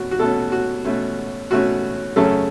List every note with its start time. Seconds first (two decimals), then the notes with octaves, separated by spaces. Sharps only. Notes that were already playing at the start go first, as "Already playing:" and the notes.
Already playing: B2 A3 C#4 F#4
0.11 F#4
0.19 B2 A3 C#4 A4
0.52 F#4
0.85 B2 A3 C#4
1.51 B2 A3 C#4 F#4
2.16 F#2 C#3 A3 C#4 A4